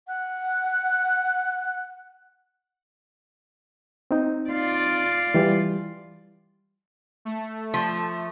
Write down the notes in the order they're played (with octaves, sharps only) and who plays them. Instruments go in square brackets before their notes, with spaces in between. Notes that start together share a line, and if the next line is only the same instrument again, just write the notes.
[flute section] F#5 F#6
[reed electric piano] C4 D#4
[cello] F4 D5
[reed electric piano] E3 G3
[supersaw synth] A3
[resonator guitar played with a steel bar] F3